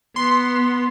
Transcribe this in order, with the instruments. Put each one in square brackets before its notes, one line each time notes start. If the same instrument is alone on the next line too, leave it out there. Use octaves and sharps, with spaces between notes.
[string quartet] B3 [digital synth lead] C6